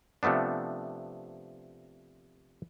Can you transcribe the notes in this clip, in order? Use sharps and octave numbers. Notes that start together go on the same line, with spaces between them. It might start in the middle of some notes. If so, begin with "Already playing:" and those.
C3 F3 A3 B3 D4